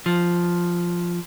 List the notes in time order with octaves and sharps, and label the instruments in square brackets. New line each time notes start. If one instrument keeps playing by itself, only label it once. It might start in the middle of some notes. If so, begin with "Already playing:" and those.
[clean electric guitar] F3